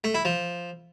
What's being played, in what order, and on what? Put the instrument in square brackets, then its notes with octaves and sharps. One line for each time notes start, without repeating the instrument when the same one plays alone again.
[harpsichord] A3
E4
F3